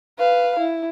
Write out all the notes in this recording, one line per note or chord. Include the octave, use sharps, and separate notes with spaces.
B4 F5
E4